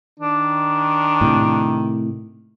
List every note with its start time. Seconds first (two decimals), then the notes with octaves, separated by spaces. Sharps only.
0.20 D#3 D4
1.21 A2 C3